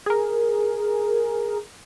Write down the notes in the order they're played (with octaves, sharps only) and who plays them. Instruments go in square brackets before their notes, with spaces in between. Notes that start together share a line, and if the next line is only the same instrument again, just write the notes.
[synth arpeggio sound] G#4 A#4